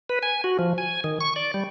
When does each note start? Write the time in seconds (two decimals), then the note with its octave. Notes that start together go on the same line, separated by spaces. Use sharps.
0.10 B4
0.23 G#5
0.44 F#4
0.59 F3
0.78 G#5
1.04 D#3
1.21 C#6
1.36 D5
1.54 G3